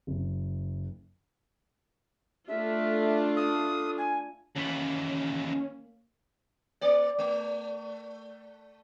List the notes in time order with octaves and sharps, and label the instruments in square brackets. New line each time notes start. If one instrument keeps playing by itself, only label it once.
[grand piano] F#1
[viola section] A3 D4 F4 [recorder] E5
[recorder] D#6
G#5
[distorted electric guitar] D#2 E3 [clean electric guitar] A#3 B5 [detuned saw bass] C#4
[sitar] A#3 D5
A3